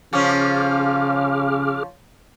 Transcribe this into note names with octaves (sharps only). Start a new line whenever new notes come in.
C#3 F3 C#4 G#4 D6 F6